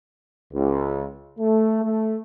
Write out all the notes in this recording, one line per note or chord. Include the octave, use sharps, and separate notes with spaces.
C#2
A3
A3